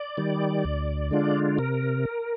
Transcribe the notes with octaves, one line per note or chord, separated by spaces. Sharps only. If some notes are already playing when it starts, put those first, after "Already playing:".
Already playing: D5
D#3 G3
D2
D3 G#3 D4 F4
C3 A#4